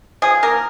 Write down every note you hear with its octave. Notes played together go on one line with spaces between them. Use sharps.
F3 G#4
A#3 A#4